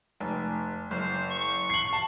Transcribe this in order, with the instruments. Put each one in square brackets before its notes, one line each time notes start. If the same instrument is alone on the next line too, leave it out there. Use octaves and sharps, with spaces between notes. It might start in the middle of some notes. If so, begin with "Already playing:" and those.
[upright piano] F1
[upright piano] F#1 [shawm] C5
[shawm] C#6
[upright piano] C7 F#7
A5